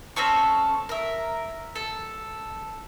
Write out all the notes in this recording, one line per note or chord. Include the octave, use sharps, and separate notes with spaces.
C4 C#4 A4 C#6
A#4 E5
A4